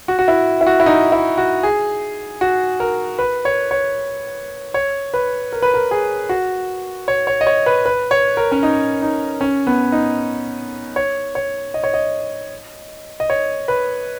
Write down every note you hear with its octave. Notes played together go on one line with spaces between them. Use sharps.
F#4
F#4
E4
E4
F#4
E4
D#4
E4
F#4
G#4
F#4
A#4
B4
C#5
C#5
C#5
B4
A#4
B4
A#4
G#4
F#4
C#5
C#5
D#5
C#5
B4
B4
C#5
A#4
C#4
D#4
D#4
C#4
B3
D#4
C#5
C#5
D#5
C#5
D#5
D#5
C#5
B4